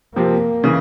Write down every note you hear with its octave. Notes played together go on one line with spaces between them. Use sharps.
C3 F3 A#3 C4
C#3 E3